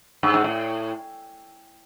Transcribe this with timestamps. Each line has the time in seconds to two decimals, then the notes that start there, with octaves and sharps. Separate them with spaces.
0.23 G2
0.34 G#2
0.44 A2